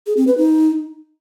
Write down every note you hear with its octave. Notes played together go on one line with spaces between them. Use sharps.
G#4
C4
B4
D#4